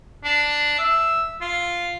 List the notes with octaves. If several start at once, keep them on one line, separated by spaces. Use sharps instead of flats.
D4
E5
F4